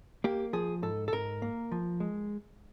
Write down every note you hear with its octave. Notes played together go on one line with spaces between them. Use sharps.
A#3 G4
F3 G#4
G#2 A4
A4
G#2 A#4
A#3
F3
G#3